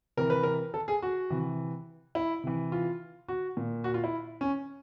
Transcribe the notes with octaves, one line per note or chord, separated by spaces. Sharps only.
C3 E3 A#4
B4
A#4
A4
G#4
F#4
C3 E3
E4
C3 E3
F4
F#4
A#2
F#4
F4
E4
C#4